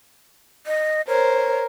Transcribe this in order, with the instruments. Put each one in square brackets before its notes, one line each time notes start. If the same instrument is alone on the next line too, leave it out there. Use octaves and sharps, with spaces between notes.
[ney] D#5
[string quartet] A#4 C5 [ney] C#5